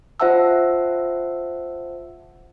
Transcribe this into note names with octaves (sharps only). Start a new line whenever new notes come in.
F4 C5 E5 F#5 A5 E6